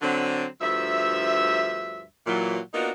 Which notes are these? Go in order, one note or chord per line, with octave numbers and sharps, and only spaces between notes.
D3 F#3 C4
D2 G2 F3 E5
A#2 E3 F#3
A#3 B3 D4 D#4 F4 F#4